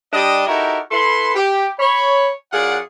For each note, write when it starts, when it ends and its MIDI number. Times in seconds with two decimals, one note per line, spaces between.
0.13 0.45 55
0.13 0.45 62
0.13 0.45 67
0.13 0.45 75
0.47 0.79 63
0.47 0.79 64
0.47 0.79 66
0.47 0.79 67
0.47 0.79 69
0.47 0.79 70
0.91 1.33 64
0.91 1.33 69
0.91 1.33 71
0.91 1.33 84
1.35 1.70 67
1.79 2.30 73
1.79 2.30 83
2.52 2.79 42
2.52 2.79 65
2.52 2.79 68
2.52 2.79 74
2.52 2.79 78